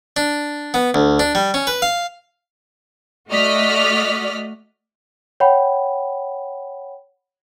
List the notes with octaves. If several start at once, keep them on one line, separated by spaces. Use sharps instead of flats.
D4
B3
D2
D4
G3
C#4
B4
F5
A3 F#4 D5 D#5 F6 B6
C#5 F#5 G5 B5